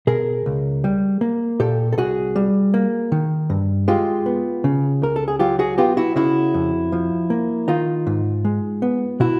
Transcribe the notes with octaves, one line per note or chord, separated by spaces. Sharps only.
B2 G#4 A#4
C#2
G3
A#3
A#2 G4 A4
A4
C2 F#4 G#4
G3
A#3
D#3
G2
G#3 F4 G4
B3
C#3
C#2 A#4
A4
G#4
F#3 F4 G4
F#4 G#4
B3 F4 G4
E4 F#4
C#3 E4 F#4
F2
F3
A#3
D#3 D#4 F4
G#2
G#3
B3
B2 E4 F#4